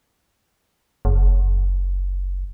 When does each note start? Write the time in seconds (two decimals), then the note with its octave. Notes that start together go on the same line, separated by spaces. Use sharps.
1.05 F#1